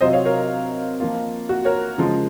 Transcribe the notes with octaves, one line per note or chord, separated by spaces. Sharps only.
C3 F#3 C4 F4 C5 D#5
C#5 F5
A#4 C#5
F3 A#3 F4
F#4
A#4 C#5
C#3 F3 G#3